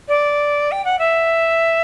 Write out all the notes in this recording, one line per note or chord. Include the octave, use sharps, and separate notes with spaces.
D5
G5
F#5
E5